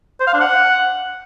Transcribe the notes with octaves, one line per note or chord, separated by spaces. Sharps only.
C5
F5
D4
F#5